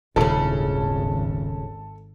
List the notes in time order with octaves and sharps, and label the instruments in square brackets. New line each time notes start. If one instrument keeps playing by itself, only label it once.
[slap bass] D#1 G#2 [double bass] G#1 [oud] C#3 E4 [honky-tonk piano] A4